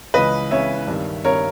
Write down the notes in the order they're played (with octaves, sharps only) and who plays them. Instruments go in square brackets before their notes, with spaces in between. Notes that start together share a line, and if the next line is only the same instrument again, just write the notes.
[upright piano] C#2 C#3 E3 B4 D#5
C#2 C#3 E3 C#5 E5
G2 D#3
G2 D#3 A#4 C#5